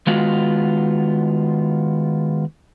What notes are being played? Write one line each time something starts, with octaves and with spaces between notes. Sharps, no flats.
D#3 G#3 B3 F4 F#4